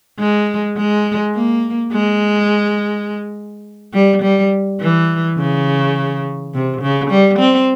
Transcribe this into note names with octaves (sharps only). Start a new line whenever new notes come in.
G#3
G#3
A#3
G#3
G3
G3
E3
C#3
C3
C#3
G3
C4